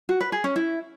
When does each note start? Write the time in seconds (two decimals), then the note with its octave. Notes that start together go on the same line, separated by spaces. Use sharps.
0.09 F#4
0.21 B4
0.32 G#4
0.44 C#4
0.56 E4